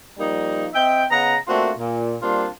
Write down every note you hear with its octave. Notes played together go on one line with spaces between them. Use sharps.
F3 G3 A#3 D#4
C4 D#5 E5 G5
C#3 B3 D#5 F#5 A#5
A3 A#3 C4 D4 F4 F#4
A#2
G3 A#3 C4 D4 F4